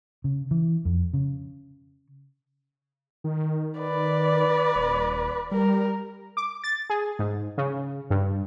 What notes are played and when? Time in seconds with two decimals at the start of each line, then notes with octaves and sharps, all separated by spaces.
0.24 C#3
0.51 E3
0.85 F2
1.14 C#3
3.24 D#3
3.79 B4 D5
4.75 D#1
5.51 G3 A#4
6.37 D6
6.64 A6
6.90 G#4
7.19 G#2
7.58 C#3
8.10 G2